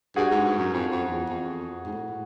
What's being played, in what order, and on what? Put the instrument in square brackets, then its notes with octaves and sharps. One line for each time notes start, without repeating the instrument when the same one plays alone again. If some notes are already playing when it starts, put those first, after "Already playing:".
[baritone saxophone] G2 [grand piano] F#4 G#4
[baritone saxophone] G#2
G#2
F#2
F2
F2
E2
F2
G#2
A2
A2